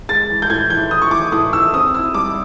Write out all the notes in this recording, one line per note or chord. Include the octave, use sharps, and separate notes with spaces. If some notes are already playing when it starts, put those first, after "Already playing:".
G#3 A6
E3
G6
A2 G#6
E3 G6
E3 D#6
C#6
E3 D6
A2 D#6
E3 E6
C4 D#6
E4 E6
G3 D6